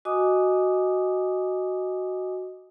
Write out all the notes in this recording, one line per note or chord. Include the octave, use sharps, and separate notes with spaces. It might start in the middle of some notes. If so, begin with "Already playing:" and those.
F#4 D#5 G#5 D6 D#6